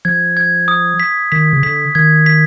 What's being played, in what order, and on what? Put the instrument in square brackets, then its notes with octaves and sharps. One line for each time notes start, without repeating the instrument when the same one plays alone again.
[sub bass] F3 [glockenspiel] G#6
[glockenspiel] G#6
D#6
B6
[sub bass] D#3 [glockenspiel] B6
[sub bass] C#3
[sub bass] D3 [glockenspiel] B6
[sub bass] D#3 [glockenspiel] G#6
[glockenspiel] B6